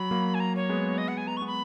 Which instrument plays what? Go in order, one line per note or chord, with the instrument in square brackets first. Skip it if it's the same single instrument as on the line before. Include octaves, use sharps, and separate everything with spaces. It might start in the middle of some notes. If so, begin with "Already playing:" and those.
Already playing: [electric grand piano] F#3 [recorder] B5
[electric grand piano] F#3 A#3
[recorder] G#5
A#5
C#5
[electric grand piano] G#3 B3
[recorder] D#5
F#5
G#5
[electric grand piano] G#3 B3 [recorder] A#5
[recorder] C#6
[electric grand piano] G#3 B3
[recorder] B5